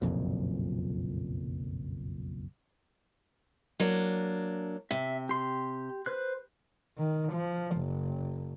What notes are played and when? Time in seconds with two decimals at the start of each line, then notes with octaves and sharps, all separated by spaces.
0.02 F#1 B1 F2 A#2
3.80 F#3 A#3 D4
4.91 C3 E5
5.29 G4 C6
6.06 B4 C5 F#6
6.98 D#3
7.33 F3
7.77 F#1